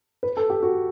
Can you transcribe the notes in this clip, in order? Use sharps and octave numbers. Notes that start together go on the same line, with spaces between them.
B4
A4
G4
F#4